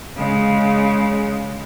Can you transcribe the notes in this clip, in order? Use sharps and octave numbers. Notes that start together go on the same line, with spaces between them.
C#3 G#3